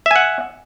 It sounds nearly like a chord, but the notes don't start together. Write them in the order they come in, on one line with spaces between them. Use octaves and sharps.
E5 G#5 F#5